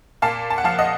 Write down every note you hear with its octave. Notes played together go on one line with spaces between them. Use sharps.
A#2 F5 A5
A5
F#5
F3 F5 A5
D#5 F#5